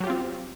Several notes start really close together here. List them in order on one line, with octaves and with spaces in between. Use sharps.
F#3 G4 F4 C4